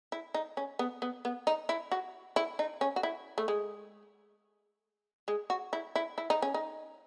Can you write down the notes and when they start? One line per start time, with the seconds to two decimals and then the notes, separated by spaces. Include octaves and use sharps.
0.12 E4
0.34 D#4
0.57 C#4
0.79 B3
1.02 B3
1.25 B3
1.47 D#4
1.69 E4
1.91 F#4
2.36 E4
2.59 D#4
2.81 C#4
2.96 F#4
3.03 E4
3.38 A3
3.48 G#3
5.28 G#3
5.50 F#4
5.73 E4
5.95 E4
6.18 E4
6.30 D#4
6.42 C#4
6.54 D#4